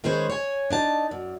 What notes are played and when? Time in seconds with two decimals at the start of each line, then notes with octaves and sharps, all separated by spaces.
0.04 D#3 G#3 C#4 G#4 B4 C5
0.30 C#5 G#5
0.70 D4 D#4 A5
1.11 F#2